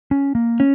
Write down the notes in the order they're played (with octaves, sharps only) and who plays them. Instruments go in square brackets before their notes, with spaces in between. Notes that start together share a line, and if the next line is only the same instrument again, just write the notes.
[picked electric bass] C#4
A#3
[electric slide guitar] C#4